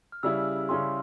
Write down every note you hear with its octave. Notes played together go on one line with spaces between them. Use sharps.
F6
C#3 G3 C#4 E4 G#4 E6
C#3 G3 C#4 E4 G#4 C6